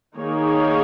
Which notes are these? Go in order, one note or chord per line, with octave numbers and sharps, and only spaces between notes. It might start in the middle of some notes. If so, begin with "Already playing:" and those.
D#3 A#3 D#4 G#4 C#5